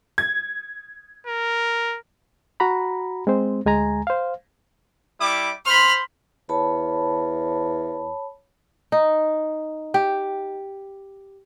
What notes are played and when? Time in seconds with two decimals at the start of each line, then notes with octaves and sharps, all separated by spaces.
0.18 G#6
1.27 A#4
2.60 F#4 A#5 B5
3.27 G#3 C4 C5
3.66 D2 G#3 G#5 A#5
4.07 C5 F5
5.21 G3 E4 D6
5.66 C5 B5 C6 F6
6.49 E2 C#5 A5 B5
8.92 D#4
9.94 G4